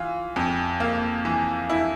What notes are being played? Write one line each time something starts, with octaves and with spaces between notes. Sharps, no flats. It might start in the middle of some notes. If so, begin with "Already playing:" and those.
Already playing: E3 F4
F2
A#3
E3
E4